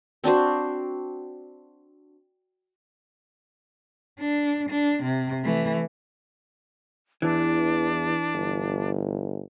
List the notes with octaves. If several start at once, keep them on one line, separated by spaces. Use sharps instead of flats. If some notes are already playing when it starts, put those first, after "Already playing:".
C4 D4 F#4 C5
D4
D4
C3
E3 A3
E2 E3 D4
G1